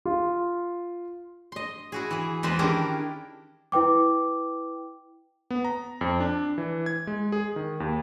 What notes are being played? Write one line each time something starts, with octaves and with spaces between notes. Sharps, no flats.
F4
D#5 C6
E4 F#4 G#4
E3 G#4
E2 G#3 B4 C5 D#5
D#3 C#4 D4 E4 G4 A#4
E4 B4 G5 D6
B3
A#5
F2
D4
E3
G#6
G#3
G#4
D#3
D#2